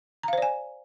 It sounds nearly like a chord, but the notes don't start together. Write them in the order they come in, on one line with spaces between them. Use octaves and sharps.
A#5 F5 C5 D5 G#5